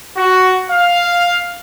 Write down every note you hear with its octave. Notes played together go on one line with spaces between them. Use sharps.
F#4
F5